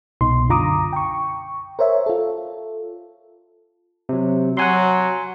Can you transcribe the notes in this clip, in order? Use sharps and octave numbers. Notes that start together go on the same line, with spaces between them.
C2 B2 D#4 C6
F#2 D3 F4 A#5 D6 D#6
G5 C#6
A#4 C5 C#5 E5
F4 A4
C3 F#3
F#3 F#5 G#5 C6